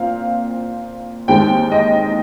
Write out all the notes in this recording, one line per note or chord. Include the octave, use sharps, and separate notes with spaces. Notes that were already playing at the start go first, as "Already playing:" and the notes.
Already playing: A#2 C4 F5
D#2 D#3 G#3 C4 G5
D#5